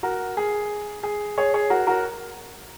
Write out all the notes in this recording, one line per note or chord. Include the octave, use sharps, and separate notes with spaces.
F#4 A#4
G#4
G#4
G#4 C#5
G#4 C#5
F#4 A#4
F#4 A#4